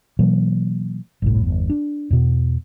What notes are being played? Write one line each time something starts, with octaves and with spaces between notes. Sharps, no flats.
B2 E3 F#3 A#3
G1 C2 A2
G1 E2
D4
E2 B2